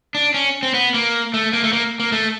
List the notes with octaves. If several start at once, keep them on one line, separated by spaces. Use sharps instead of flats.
D4
C#4
C4
B3
A#3
A3
A#3
A3
A#3
A#3
A3